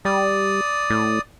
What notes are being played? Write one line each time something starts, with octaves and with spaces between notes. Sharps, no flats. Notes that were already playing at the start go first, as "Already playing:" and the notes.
G3 D5 D#6
A2